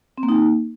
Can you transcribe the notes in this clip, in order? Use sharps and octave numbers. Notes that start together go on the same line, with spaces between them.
C4
A#3
D#4
A#3